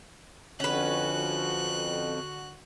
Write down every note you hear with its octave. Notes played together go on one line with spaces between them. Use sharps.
F2 D3 C#4 F#4 B4 F#6